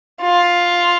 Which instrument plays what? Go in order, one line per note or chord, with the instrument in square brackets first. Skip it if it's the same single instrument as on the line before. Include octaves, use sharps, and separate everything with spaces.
[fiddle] F4